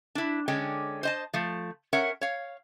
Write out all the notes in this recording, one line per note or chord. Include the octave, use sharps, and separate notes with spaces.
D4 E4
D3 G#3 C#4 G5
C5 D#5 A5
F3 A3
C#4 A#4 C#5 E5 F#5
C#5 F5